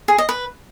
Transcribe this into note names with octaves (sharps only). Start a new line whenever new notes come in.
G#4
D#5
B4